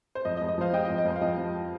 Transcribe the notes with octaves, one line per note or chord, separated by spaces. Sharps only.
C5
F2 D#5
D#5
F2
D#5
F3 C5 F5
F3 D#5 G5
D#5
F2
D#5
F2 C5
F5
F3 D#5
F3